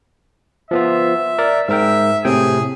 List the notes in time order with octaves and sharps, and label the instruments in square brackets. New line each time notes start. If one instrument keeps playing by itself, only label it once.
[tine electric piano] F3 B3 F4 [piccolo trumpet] E5
[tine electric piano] A#4 D5
[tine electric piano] G#2 A#4 G5 [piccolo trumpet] E5
[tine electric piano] A2 C3 G5 [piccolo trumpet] G#4